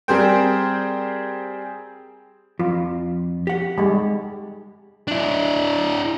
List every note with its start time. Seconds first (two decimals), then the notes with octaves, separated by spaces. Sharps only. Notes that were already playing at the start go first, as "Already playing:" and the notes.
0.08 G3 C4 G#4 A#4 C5 G5
2.59 F2 F4
3.47 G4 F#5
3.78 G3 G#3
5.08 D4 E4